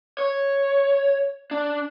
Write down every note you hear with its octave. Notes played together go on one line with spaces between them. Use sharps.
C#5
D4